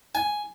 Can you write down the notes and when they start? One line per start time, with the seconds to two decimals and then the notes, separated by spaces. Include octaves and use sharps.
0.15 G#5